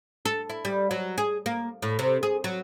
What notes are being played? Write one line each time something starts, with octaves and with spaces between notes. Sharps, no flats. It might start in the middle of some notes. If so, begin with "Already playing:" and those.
A4
E4
G3
F#3
G#4
A#3
A2
C3
G#4
F#3